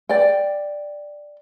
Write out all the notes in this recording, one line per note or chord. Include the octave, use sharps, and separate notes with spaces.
D5 G5